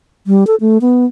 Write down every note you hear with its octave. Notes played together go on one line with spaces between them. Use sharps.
G3
A4
A3
B3